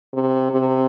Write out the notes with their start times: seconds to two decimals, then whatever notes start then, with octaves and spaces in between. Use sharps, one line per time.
0.14 C3
0.51 C3